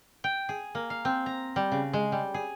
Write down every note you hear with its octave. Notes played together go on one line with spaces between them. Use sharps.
G5
G#4
A#3
F5
C4
A#5
G3
C#3
G#3
G3
G#4